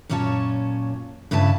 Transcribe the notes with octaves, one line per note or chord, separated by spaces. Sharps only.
F#2 A#2 C#4 F4 C#5 A5
G2 C#3 E4 B4 A5